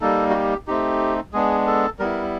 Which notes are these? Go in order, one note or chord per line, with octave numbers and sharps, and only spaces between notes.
G3 A#3 D#4 A4
F#4
G4
A3 C4 D#4 G4
G#3 B3 D4 G#4
A4
G3 B3 E4 A#4